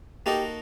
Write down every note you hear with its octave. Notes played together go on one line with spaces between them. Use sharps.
A#3 D#4 F#4 G4 A4 D#5